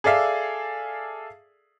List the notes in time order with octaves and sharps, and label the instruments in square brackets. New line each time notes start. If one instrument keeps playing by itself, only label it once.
[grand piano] G#4 A4 D5 E5 F5